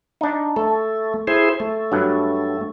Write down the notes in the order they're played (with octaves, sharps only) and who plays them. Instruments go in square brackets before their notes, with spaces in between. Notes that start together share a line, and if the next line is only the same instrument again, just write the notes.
[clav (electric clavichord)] D4 D#4
[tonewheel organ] A3 [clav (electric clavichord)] A4
[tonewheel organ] E4 G#4 C5
A3
[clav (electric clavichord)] G2 F#3